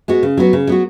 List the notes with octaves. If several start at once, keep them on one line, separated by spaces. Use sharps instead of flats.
G#3 B3 F#4
C#3
F#3 B3 F#4
C#3
F#3 B3 F#4